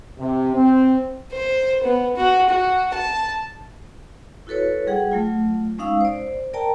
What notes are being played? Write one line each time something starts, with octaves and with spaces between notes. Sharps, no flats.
C3
C4
C5
B3
F#4
F#4
A5
E4 F#4 A4 B4 C#5
G3 G#4 F#5 G5
F#3 A3 F4
G#3 C#4 D#4 F5 D#6 E6
C5 D5
A#4 D5 G5 A5 A#5